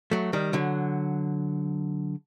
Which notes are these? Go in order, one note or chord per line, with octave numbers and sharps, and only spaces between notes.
F#3 A3
D#3 G3
D3 F#3